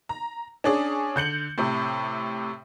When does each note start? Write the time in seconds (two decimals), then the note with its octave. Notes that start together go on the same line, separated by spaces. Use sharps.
0.09 A#5
0.64 C#4 D4 G#4
1.16 D3 G6 C#7 F#7
1.58 A2 C3